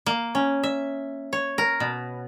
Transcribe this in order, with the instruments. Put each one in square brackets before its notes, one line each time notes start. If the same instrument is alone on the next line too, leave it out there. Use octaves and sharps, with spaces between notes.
[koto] A#3
C#4
E5
C#5
A#4
B2